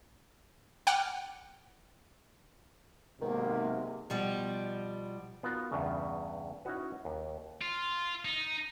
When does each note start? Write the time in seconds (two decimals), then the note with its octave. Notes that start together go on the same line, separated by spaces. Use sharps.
0.87 F#5 G5 D6 F6
3.21 B1 G#2 C3 D#3 A#3
4.10 B2 F3 G3
5.43 B3 D#4 F4 F#4 A#4
5.72 E2 G2 C#3
6.65 C#4 D#4 E4 F#4 B4
7.05 D#2
7.62 F4
8.25 D#4